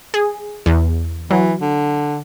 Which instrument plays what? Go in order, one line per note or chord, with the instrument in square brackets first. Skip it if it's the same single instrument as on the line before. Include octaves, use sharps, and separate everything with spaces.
[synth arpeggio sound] G#4
E2
[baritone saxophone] E3 [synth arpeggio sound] F#3
[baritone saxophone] D3